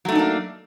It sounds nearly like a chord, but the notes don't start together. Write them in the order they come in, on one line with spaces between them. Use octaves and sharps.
F#3 A3 D#4 D4 A#3